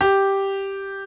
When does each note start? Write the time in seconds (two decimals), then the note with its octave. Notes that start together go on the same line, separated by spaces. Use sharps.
0.01 G4